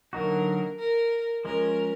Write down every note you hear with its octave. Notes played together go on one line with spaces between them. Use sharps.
D3 F#3 A#3 D#4 F#4 A#4
A#4
F3 G#3 C#4 A#4